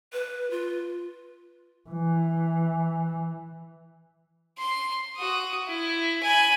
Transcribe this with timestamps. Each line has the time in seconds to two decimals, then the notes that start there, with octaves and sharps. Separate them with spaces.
0.13 B4
0.51 F4
1.90 E3
4.58 C6
5.16 F#4 D#6
5.68 E4
6.23 G#5 B5